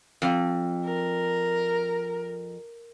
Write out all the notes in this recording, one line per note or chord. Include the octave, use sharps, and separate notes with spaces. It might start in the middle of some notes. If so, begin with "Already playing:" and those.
F2
A#4